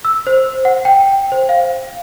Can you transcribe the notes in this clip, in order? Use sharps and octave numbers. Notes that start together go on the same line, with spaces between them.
E6
C5
F#5
G5
C5
F5